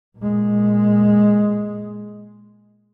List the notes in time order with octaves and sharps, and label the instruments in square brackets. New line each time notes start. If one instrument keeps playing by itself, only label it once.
[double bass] A#2 G#3